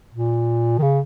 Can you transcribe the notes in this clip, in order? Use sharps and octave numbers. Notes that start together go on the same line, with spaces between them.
A#2
D#3
C#3